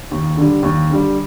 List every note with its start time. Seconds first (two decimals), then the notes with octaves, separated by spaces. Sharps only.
0.11 D#2
0.37 D3 G3
0.63 D#2
0.90 D3 G3